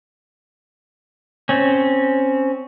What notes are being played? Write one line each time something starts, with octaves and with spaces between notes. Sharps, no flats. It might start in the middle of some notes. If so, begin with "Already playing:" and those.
C4 C#4